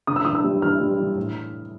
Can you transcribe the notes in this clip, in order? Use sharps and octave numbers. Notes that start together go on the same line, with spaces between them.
C#3 D#6
E6
E3 D#6
E6
G3
E3 F6
G3
E3
A2